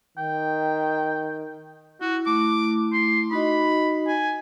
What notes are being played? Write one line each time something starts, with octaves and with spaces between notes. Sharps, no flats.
D#3 G5
E4 F#4
A3 E4 D6
C6
D#4 F#4 D#5 B5
G#5